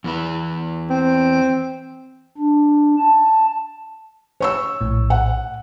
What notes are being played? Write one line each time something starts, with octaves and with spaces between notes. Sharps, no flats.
E2 E3 B4
C4
D4
A5
C#5 C#6 E6
A#1 A2
F#5